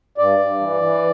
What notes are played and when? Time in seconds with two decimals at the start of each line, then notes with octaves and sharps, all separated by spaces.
0.18 G2 D5
0.39 G2
0.60 E3
0.82 E3